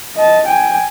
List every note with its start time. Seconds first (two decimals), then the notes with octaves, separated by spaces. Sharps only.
0.16 D#5 A5
0.47 G5 G#5